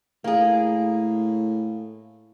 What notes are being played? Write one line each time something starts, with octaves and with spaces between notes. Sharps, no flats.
A2 A#3 G#4